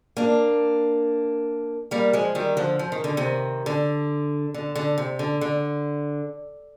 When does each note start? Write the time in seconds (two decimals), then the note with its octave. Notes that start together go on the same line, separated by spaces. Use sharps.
0.17 A#3 D4
1.91 G3 A#3
2.13 F3 G#3
2.35 D#3 G3
2.57 D3 F3
2.79 F3
2.92 D#3
3.04 D3
3.17 C3 D#3
3.66 D3
4.54 D3
4.75 D3
4.98 C3
5.19 D3
5.41 D3